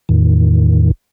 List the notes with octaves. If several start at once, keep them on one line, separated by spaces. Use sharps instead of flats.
E2 A2 D#3